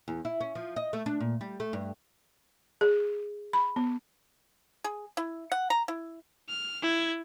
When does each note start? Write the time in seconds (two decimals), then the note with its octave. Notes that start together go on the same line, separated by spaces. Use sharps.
0.08 E2
0.25 E4
0.40 C#4
0.55 F3
0.76 D#5
0.93 A3
1.06 D4
1.20 A#2
1.41 G3
1.60 A3
1.73 G2
2.81 G#4
3.53 B5
3.76 B3
4.84 G#4
5.17 E4
5.52 F#5
5.70 A#5
5.88 E4
6.49 F6
6.82 E4 G#6